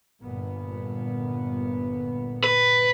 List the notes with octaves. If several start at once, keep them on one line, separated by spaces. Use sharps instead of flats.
G1 A#2 B3
B4